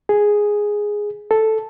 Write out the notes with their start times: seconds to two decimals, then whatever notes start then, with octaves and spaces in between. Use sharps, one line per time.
0.09 G#4
1.31 A4